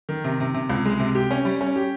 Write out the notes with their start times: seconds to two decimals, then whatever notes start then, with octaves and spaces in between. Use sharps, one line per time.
0.09 D#3
0.24 C3
0.40 C3
0.54 C3
0.70 C#2
0.85 G#3
1.00 C3
1.15 G4
1.31 C#4
1.45 G3
1.61 C#4
1.76 G4